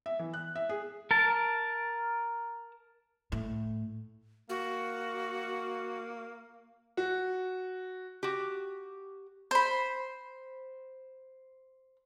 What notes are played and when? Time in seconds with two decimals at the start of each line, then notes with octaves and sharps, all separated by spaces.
0.06 E5
0.19 E3
0.34 F#6
0.56 E5
0.69 G#4
1.11 A#4 A5
3.32 A2
4.49 A#3 F#4
6.97 F#4
8.23 F#4 G4
9.51 C5 B5